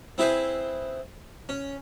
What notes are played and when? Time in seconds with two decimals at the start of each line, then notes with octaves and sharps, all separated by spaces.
0.18 C4 E4 G#4 B4 C5
1.49 C#4